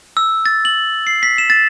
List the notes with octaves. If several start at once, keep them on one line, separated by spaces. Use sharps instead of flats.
E6
A6
F#7
C7
B6
E7
A6